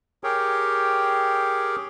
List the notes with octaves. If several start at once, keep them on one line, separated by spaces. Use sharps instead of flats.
G4 G#4 A#4 C#5 G5